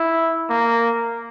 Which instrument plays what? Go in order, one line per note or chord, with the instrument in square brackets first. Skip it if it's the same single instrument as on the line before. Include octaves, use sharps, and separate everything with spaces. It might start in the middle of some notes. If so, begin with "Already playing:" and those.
Already playing: [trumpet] E4
A#3